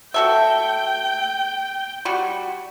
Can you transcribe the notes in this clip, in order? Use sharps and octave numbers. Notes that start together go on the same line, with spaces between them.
F#4 A4 E5 G5
G3 F#4